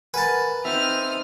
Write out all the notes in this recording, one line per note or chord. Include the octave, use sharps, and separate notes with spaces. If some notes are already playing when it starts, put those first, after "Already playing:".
A#4 B4 F#5 G#5 A5
C4 D#4 C5 E5 D#6 F6